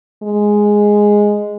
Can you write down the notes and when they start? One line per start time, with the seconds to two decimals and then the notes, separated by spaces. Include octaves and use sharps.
0.23 G#3